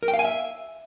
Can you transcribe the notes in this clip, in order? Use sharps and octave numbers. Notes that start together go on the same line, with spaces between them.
A#4
G5
F5
G#5
E5